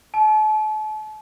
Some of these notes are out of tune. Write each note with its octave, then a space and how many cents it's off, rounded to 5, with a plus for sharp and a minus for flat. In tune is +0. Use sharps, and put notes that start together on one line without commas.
A5 -40